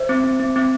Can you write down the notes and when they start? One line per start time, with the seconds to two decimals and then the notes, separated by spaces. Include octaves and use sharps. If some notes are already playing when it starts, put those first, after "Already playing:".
Already playing: C5 E5
0.09 C4
0.24 C4
0.40 C4
0.56 C4